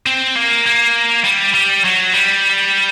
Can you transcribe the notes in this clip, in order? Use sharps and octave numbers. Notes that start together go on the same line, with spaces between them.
C4
A#3
A#3
G3
G3
F#3
G3